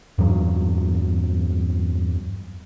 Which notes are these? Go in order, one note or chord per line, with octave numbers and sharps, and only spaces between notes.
E2 G2 F#3